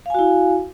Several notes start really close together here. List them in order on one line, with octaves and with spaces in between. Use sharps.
F5 G#5 F#4 E4